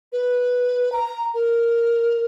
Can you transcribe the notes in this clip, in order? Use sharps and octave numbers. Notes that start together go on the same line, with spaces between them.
B4
A#5
A#4